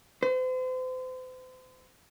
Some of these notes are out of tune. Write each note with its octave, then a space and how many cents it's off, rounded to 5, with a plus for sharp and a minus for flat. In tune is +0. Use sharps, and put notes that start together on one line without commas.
C5 -40